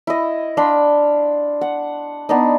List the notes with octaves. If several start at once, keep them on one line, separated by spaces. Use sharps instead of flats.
E4 D#5
D4 F5 B5 C6
F#5
B3 D4 D#4